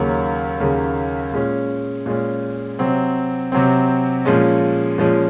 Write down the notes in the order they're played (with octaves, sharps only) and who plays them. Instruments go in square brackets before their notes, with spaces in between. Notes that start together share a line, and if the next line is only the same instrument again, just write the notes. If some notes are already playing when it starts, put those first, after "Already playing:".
Already playing: [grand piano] D#2 C#3 F#3 A#3
D#2 C#3 F#3 A#3
A#2 G#3 C#4
A#2 G#3 C#4
C3 F#3 C4
C3 F#3 C4
A#2 F3 G#3 C#4
A#2 F3 G#3 C#4